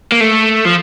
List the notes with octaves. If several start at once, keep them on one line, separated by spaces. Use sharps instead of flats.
A#3
A3
F3